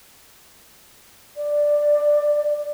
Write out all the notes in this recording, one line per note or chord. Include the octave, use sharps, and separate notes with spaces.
D5